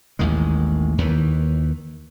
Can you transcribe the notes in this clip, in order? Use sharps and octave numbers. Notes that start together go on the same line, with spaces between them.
A1 D#2 D#3 G#3
D#2 D#3 E3